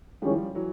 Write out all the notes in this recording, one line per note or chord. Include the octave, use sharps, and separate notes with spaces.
D#3 F3 G3 G#3 C#4 E4
E3 F#3